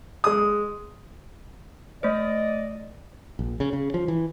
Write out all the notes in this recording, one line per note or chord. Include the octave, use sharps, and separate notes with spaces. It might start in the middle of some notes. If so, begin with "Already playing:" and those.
G#3 D#6
A3 C5 D5 D#5
A#1
C#3
C#3
F3
E3